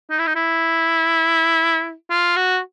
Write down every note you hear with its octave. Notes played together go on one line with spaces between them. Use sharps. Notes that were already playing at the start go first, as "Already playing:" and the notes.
D#4
E4
D#4
E4
F4
F#4